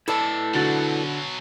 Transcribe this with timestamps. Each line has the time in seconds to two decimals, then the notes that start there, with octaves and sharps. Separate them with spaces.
0.08 E4 A4 B4 D5 A5
0.54 B2 D3 F#3 F#4 A6